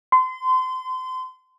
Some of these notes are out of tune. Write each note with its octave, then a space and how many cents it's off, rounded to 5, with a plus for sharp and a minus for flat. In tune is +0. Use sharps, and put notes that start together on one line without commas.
C6 -30